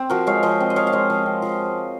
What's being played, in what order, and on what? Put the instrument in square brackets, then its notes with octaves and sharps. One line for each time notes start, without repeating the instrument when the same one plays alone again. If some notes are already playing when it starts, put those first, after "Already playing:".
Already playing: [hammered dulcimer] C4
F3 F#4 A#4
G#3 C#5 F5
F3 C5 D#5
C4
D#5
F3 C#5 F5
F5
G#3 C5 D#5
F3
C4
F3